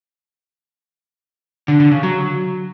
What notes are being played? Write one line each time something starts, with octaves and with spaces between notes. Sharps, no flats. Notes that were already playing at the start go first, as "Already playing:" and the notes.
D3
D3
C#3
F#3